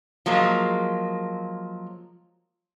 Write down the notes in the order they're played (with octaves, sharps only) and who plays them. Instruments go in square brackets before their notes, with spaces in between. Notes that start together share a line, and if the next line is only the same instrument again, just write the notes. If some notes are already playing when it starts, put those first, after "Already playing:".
[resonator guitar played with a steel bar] F3 F#3 G#3 A#3